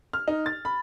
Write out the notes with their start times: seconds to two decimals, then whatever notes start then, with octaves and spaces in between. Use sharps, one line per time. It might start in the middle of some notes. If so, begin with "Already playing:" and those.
0.13 F6
0.28 D#4
0.46 A6
0.65 B5